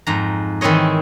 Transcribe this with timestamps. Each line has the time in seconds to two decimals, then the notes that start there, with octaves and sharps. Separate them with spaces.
0.07 F2 G#2 A#5
0.61 D#3 E3 C4 E4 C#5 D#5